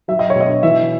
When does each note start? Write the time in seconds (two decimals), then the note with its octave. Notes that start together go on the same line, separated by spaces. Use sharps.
0.08 F#3 E5
0.19 D#5
0.30 C#5
0.36 B2 D#5
0.63 E3 E5